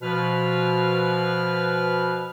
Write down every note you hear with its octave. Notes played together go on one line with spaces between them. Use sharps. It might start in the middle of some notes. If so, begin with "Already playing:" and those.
B2 F3 B4 F6